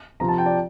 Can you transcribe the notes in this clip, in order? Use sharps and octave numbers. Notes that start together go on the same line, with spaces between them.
C3 F3 C4 F4 A#5
A5
G5
D5